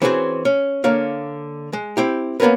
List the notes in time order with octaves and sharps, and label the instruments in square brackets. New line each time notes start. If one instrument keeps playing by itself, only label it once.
[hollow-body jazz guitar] E3 C4 C#4 F#4 G#4 C5
C#4
D3 A#3 C#5 F5
G#3
C4 E4 G4
A#3 B3 C#4 A#4 B4